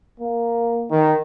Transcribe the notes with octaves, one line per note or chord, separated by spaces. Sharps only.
A#3
D#3